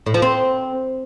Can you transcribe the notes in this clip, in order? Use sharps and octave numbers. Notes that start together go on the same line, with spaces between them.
A2
F3
C4